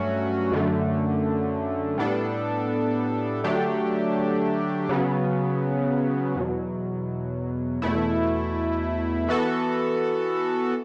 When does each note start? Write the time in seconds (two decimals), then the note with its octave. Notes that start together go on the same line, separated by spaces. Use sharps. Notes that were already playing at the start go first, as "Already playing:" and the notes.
Already playing: G2 F#3 A3 C#4 F#4
0.52 F#2 D3 A3
1.98 A2 G3 B3 D4 A4
3.44 D3 F#3 A3 D4 G4
4.89 C#3 F#3 B3
6.35 E2 B2 F#3
7.82 E2 B2 A3 E4
9.28 E3 B3 F#4 A4